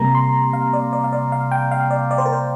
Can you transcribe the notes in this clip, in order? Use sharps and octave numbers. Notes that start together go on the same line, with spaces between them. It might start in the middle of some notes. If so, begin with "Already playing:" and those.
Already playing: C3 G3 A#3 A#5
C6
F5
D5
D5
F5
D5
F5
G5
F5
D5
D5
C5
A#4
C5